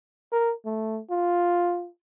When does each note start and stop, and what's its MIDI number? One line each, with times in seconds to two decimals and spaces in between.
0.32 0.52 70
0.65 1.00 57
1.10 1.87 65